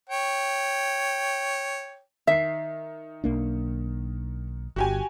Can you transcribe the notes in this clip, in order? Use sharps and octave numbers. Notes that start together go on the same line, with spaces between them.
C#5 G5
D#3 E5 C7
B1 A#3 D4
G1 F#4 G4 G#5